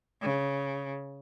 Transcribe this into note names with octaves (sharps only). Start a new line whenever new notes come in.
C#3